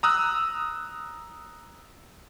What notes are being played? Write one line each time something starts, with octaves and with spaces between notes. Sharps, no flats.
A#5 D#6 E6 F#6